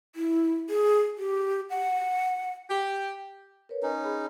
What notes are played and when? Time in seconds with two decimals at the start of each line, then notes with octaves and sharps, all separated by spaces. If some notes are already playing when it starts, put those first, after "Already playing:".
0.15 E4
0.70 G#4
1.18 G4
1.70 F#5
2.70 G4
3.69 A#4 B4 C#5
3.83 C#4 D#4
4.04 G#4 B5